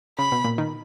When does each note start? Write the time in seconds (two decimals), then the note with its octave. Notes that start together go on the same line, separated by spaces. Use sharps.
0.19 C#3 B5
0.32 B2
0.44 A#2
0.58 D#3